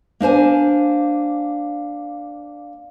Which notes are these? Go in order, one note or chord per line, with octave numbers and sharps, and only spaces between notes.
A#3 D4 C5 G#5